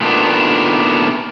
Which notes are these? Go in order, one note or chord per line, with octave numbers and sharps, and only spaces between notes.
A#2 D#3 A3 B3 D4